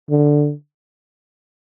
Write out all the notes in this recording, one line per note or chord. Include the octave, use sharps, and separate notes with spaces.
D3